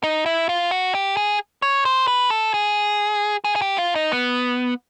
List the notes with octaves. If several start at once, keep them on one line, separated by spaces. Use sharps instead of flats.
D#4
E4
F4
F#4
G4
G#4
C#5
C5
B4
A4
G#4
G#4
G#4
G4
F4
D#4
B3